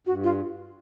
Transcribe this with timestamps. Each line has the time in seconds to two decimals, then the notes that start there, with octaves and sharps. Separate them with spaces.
0.06 G2 F#4
0.24 F4